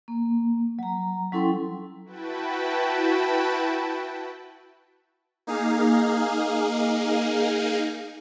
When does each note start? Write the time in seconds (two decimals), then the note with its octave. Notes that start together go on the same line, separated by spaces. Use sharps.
0.08 A#3
0.79 F#3 A#5
1.32 F#3 C#4 E4 A4 G5 C6
2.05 E4 F#4 B4 G5 A5 B5
5.47 A#3 D#4 G#4 F5